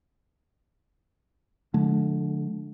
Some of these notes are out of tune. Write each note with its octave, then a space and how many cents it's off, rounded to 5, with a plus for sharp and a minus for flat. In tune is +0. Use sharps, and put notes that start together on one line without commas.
D3 +0 F3 +40 A3 -45